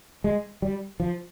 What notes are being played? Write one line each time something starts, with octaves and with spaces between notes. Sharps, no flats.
G#3
G3
F3